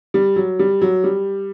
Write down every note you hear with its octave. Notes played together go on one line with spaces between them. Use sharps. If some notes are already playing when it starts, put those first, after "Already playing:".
G3
F#3
G3
F#3
G3